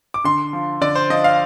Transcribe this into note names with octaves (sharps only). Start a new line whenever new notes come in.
D6
D3 C6
F3
D3 D5
C5
F3 D#5
F5